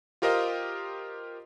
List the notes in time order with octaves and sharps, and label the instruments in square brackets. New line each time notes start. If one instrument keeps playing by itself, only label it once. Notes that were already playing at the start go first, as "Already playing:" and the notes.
[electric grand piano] F4 G4 A#4 C5 D#5 F5